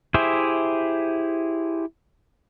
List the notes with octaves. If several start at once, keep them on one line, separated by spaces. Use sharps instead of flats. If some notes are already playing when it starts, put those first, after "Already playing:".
E4 G4 G#4 C5 E5